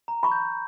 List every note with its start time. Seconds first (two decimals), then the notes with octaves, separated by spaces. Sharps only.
0.08 A#5
0.23 B5 C#6
0.32 G6